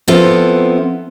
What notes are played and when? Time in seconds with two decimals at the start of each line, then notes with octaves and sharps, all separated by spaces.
0.08 F3 B3 C4 E4 F4 A4